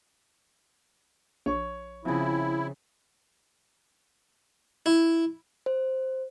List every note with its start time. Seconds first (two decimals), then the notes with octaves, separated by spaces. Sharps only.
1.46 A#1 C#5 C#6
2.05 C#3 F3 C4 E4
4.86 E4
5.66 C5